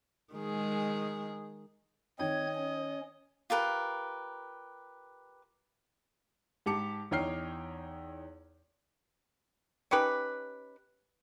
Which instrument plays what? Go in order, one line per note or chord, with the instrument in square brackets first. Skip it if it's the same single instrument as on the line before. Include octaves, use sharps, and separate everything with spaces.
[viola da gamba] D#3 G#3 G#4
[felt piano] D#3 G5 [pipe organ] C4 G#6 [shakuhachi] C#5 [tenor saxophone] D#5
[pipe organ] C#4
[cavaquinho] F4 G4 A#4 B4
[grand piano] G#2 G4 A5 D6 C#7
E2 D#4 C#5 G5 F6 C7
[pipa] C#4 D#4 G4 B4